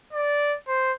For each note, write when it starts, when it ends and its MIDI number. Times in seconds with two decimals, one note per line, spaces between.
0.13 0.55 74
0.67 0.92 72